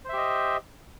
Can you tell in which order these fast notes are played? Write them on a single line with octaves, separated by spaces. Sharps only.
C5 E5 G4 D#5